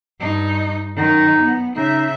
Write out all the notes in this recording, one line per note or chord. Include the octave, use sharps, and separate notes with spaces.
G2 D#4
F#2 D#3 D#4
B3
C#3 D#4 E5